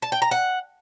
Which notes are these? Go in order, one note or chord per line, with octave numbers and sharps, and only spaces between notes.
A5
G5
A#5
F#5